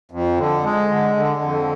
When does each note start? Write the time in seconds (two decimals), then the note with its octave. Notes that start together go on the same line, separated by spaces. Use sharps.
0.11 F2
0.37 D3
0.64 G#3
0.90 D3
1.16 D3
1.42 F2